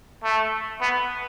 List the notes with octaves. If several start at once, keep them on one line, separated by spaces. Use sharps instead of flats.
A3
B3